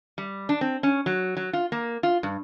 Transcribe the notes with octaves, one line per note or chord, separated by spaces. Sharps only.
G3
D4
C4
C#4
F#3
F#3
F4
A#3
F4
G2